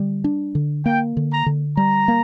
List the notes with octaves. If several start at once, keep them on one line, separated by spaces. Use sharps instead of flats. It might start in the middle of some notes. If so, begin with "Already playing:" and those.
Already playing: D3 G3
D4
D3
A#3 G5
D3
A#5
D3
G3 A#5
A#3